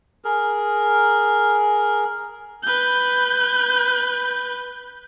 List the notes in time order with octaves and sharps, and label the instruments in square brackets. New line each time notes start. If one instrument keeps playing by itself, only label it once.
[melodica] G#4 A#4
[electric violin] B4 G6